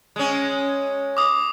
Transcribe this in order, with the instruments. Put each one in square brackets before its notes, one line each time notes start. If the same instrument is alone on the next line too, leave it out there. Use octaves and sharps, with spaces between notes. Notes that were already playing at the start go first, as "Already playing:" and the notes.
[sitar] G#3 C#4
[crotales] D6 D#6